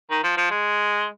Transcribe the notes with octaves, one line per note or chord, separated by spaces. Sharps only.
D#3
F3
F3
G#3